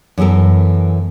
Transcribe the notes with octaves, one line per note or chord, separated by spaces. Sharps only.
F#2 E3 B3 A4 A#4